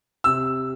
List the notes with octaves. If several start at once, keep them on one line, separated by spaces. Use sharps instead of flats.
C3 E6